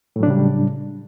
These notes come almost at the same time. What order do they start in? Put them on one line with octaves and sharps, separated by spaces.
A2 F#3 D4 C#3 G3